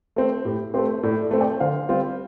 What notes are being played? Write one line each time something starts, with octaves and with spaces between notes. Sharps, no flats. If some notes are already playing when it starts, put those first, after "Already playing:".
A3 C4
A2 G4
A3 C4 G4 C5
A2 A4 D5
A4 D5
A3 C4
D5 G5
D3 C5 F5
G3 C4 F4